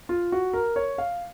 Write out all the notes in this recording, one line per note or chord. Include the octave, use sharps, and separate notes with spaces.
F4
F#4
A#4
C#5
F5